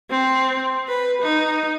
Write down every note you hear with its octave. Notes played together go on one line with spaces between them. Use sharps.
C4
B4
D#4